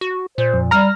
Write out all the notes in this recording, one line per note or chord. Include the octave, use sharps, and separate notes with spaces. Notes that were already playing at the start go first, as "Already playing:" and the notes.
F#4
A#2 C5
F2
G3 A#5 F6 A#6